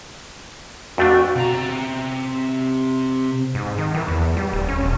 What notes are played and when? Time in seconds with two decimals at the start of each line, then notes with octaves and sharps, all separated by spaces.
0.98 F2 A3 D4 F#4
1.36 C3 A#5
3.55 G#2
3.78 D#3
3.94 E3
4.08 E2
4.37 G3
4.53 D1
4.68 C#4
4.81 E1